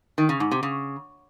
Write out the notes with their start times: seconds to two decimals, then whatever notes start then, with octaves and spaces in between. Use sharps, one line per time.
0.18 D#3
0.29 C#3
0.40 G#2
0.51 C3
0.63 C#3